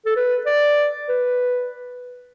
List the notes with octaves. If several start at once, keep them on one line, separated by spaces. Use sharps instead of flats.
A4
B4
D5
B4